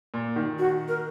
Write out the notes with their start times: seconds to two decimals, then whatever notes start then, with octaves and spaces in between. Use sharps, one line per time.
0.14 A#2
0.36 D#3
0.59 F#4
0.88 A#4